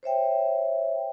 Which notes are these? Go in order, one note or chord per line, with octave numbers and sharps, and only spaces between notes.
C5 C#5 E5 G5